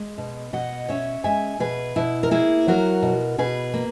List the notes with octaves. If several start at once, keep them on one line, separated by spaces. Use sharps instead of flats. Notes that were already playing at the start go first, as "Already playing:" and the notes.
Already playing: G#3
B2
B2 D#5 F#5
C#4 C#5 E5
G#3 E5 G#5
B2 G#4 B4
B2 E4
A#4
A#3 E4 G#4
F#3 F#4 A#4
B2
B2 G#4 B4
A#3